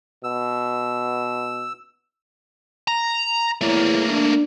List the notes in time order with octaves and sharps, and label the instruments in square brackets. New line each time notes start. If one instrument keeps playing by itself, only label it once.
[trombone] B2 [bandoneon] E6
[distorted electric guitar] A#5
[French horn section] E2 E4 C#5 [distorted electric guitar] A3 A#3
[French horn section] D4